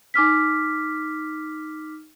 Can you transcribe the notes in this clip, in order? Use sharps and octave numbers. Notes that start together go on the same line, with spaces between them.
D#4 D6 F6 B6